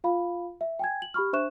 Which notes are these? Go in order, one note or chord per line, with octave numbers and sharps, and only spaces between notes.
F4 F5 B5
E5
G5 G#5 G#6
F#7
G4 B5 C#6 F6
D4 C5 E5 C#6 F#6 E7